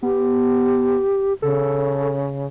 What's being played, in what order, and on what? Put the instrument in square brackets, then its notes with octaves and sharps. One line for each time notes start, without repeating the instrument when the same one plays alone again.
[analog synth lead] B3 [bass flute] G4
[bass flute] C#3 [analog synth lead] A4